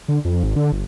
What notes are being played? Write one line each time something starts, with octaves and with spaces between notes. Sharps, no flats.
D3
F2
G#1
D3
G1